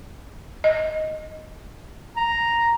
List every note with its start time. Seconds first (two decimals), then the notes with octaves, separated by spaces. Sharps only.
0.64 D#5
2.16 A#5